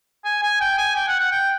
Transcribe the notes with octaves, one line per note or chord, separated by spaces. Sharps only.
G#5
G#5
G5
G#5
G5
F#5
F#5
G5